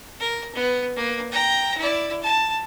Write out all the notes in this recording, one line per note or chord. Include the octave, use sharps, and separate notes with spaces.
A#4
B3
A#3 B4
G5 A#5
E4 D5
A5